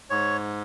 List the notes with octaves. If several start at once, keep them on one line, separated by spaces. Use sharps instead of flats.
G#2 C#5